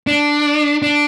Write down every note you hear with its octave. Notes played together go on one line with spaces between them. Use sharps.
D4
D4